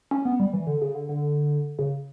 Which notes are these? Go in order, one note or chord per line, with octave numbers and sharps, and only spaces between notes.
C#4
B3
G3
E3
D3
C#3
D3
D3
C#3